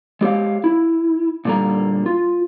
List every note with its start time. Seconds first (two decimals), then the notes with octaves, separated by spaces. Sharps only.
0.21 G#3 G4 C#5 F5
0.64 E4
1.45 A#2 D3 G3 A#3 A#5
2.06 F4